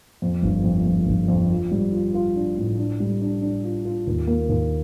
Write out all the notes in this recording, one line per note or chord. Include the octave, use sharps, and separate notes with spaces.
F2
G1
F2
F2
G1
F2
F4
G3
F4
F4
D4
A2
D4
G3
D4
D4
F4
F4
D#2
A#3
D#2